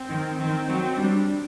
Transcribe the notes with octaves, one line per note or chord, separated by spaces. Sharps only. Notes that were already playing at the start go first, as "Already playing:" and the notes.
Already playing: C4
D#3
D#3 C4
F#3 C4
G3 D4